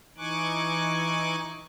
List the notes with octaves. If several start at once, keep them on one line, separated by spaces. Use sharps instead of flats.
E3 D#4 G#5 C#6 D6 F#6